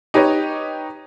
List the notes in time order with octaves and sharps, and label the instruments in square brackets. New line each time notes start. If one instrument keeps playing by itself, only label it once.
[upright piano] D#4 G4 B4 C#5 D#5